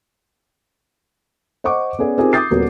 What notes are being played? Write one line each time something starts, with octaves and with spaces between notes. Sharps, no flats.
C5 D#5 F#5 C#6 D6
B3 C#4 G#4 D5
C4 D#4 F4 G4 G#4 A#4
D6 D#6 G6 A6 C7
D#1 B3 F#4 A#4